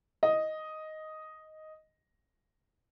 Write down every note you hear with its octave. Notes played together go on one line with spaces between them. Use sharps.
D#5